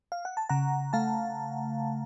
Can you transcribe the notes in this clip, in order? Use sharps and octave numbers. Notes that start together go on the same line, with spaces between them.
F5
F#5
A5
C#3 F#5 A#5
A3 F5 A5